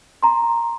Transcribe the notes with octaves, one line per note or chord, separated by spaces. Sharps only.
A#5 C6